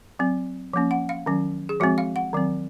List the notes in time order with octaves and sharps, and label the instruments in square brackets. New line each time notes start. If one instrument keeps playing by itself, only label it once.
[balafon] F#3 C4
F3 A#3 C#4
F#5
F5
D#3 F#3 C#4
G#4
F3 G#3 C4 F#4
F5
F#5
D#3 F#3 C4